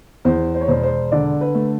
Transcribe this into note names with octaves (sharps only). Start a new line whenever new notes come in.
E2 C5
C5
C#5
E1 C5
C5
D3 D5
B4
A3